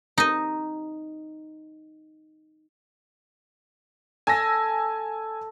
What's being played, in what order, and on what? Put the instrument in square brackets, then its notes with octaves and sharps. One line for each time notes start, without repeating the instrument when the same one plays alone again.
[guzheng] D#4 D#5
[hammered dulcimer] A4 [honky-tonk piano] G#5 E6 A#6